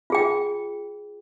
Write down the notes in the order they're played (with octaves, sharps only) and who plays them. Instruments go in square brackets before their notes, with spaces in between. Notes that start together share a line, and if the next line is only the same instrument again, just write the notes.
[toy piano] F4 G#4 G5